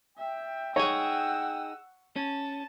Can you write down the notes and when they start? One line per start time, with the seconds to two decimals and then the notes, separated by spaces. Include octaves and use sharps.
0.18 E5 G5
0.76 D#4 G#4 C#5 F#5 E6
2.16 C#4 A5